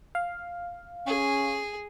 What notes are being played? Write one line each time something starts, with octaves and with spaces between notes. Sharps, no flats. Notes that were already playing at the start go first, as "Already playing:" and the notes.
F5
C#4 G#4